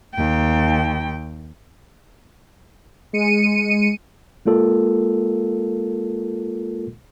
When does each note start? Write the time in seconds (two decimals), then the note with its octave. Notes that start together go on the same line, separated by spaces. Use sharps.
0.14 D#2 G5
3.13 G#3 C#7 D#7
4.45 G#3 A#3 F4 A4 A#4